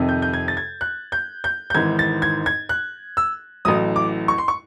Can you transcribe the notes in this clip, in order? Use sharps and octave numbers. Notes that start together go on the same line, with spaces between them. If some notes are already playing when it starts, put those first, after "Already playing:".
Already playing: F2 C3 D#3
G6
G6
G#6
A6
G#6
F#6
G6
G6
G6
G#1 G#2 E3 G#6
A6
G#6
G#6
F#6
E6
A1 A2 F#3 D#6
D6
C#6
C6
C#6